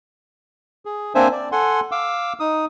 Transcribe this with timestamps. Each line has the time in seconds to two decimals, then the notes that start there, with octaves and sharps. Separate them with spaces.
0.85 G#4
1.15 A#3 C4 D4 C5 E5 G#5
1.32 D5
1.52 A4 F#5 G#5 C6
1.92 F5 D6 E6
2.40 D#4 D#6